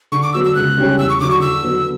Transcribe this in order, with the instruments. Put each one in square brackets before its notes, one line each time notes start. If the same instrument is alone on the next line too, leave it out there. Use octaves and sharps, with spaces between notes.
[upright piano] D3 [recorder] C#6
[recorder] D6
[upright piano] F#3 B3 F#4 [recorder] E6
[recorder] E6
[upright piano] C#2 [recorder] F#6
[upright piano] C#3 G3 C#4 G4
[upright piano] E2 [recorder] E6
[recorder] C#6
[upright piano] D3 F#3 [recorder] D6
[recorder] C#6
[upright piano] D3 [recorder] E6
[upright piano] F#3 B3 F#4